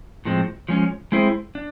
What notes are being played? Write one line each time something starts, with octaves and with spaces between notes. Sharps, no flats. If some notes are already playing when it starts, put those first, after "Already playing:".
A2 F3 G#3 C4
F3 G#3 C#4
G#3 C4 E4 G#4 C5
D4